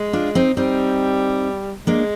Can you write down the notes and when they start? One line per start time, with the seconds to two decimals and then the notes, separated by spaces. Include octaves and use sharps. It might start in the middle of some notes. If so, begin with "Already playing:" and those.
Already playing: G#3
0.13 D4 F4
0.35 C4 D#4
0.57 G3 C4 D#4
1.87 G#3 A#3 D4